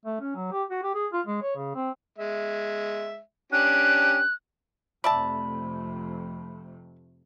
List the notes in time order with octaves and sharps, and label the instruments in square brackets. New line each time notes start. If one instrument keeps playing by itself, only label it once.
[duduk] A3
C#4
F#3
G4
F#4
G4
G#4
F4
G#3
C#5
C#3
C4
[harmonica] G#3 E5
[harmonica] C#4 D4 G4 [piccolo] F#6
[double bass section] F2 C3 A3 [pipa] D5 E5 A5 [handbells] B5